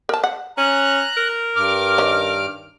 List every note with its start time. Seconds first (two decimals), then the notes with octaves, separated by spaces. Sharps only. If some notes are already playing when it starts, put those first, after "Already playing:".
0.09 A#4 A5
0.24 F#5
0.57 C#4 A#5 F#6
1.17 A#4
1.56 G2 D6 F6
1.98 D#3 C#4